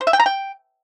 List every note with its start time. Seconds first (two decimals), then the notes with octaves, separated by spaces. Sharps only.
0.01 C5
0.07 E5
0.13 G5
0.20 A#5
0.26 G5